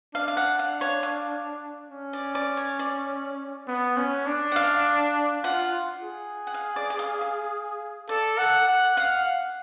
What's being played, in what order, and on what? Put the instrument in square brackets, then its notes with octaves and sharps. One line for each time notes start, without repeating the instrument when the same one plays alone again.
[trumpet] D4 [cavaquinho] F5
[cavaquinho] F5
F#5
F5
C#5
F5
[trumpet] C#4
[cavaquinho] D5
D5
C#5
D5
[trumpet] B3
C#4
D4
[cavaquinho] F#5
F5
[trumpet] F4 [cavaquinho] F#5
[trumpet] G#4
[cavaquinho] F#5
F5
D5
D5
F5
F5
[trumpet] A4 [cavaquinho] D5
[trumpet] F#5
F#5
[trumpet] F5 [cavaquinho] F#5